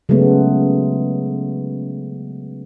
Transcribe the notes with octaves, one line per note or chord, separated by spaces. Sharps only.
C#3 F#3 G#3 A3 B3